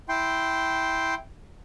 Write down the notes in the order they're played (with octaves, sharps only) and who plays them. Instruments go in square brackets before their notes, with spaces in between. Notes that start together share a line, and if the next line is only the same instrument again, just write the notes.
[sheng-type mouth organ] E4 G5 C6